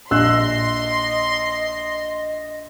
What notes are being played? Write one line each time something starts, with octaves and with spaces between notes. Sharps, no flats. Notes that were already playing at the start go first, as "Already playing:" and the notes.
A#1 D#5 C6 E6 F#6